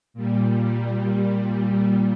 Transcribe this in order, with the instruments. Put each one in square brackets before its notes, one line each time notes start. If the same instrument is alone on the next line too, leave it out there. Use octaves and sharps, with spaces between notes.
[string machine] A#2 G3